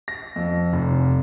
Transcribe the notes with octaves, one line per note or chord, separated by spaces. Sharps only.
A#6
F2
F1